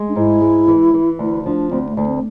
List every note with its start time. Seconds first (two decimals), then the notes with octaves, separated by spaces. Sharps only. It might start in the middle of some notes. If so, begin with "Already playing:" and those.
Already playing: G#3
0.09 D4
0.16 G#2 E4
0.42 G#3
0.68 E3
0.94 E3
1.19 D2 E4
1.45 F3 D4
1.71 D2 C4
1.89 A3
1.97 D2
2.06 C4